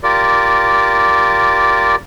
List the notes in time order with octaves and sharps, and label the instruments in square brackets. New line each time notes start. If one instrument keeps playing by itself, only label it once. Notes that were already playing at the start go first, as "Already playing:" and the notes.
[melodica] F4 G4 A#4 D5